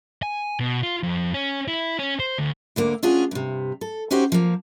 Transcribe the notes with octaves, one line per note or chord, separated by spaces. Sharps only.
G#5
B2
F4
F2
C#4
E4
C#4
C5
D2
D2 D3 A#3
C#4 D4 F4 F#4 G#4
G2 C3
A4
C#4 D#4 F#4 G4 C5 C#5
F3 A#3